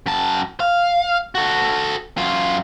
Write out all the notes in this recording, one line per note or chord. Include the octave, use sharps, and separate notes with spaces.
F#2 A5
F5
F#4 A4
F#2 F4